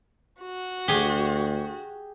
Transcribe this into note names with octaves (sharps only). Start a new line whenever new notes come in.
F#4
D2 G4 G#4